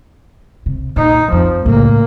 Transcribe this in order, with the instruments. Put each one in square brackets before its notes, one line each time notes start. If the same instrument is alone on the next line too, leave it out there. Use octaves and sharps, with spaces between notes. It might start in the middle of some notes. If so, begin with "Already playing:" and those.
[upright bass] C3
[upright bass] A#2 [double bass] D#4
[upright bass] F2 [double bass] F3
[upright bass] A2 C#3 [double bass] A#3